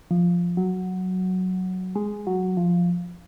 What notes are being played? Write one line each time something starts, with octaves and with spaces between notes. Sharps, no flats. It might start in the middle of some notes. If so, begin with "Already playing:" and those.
F3
F#3
G#3
F#3
F3